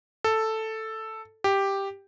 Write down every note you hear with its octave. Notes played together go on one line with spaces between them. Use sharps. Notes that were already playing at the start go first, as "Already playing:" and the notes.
A4
G4